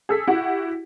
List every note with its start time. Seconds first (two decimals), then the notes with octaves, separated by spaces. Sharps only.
0.09 G#4 A4 B6
0.28 E4 F#4 G4 F#5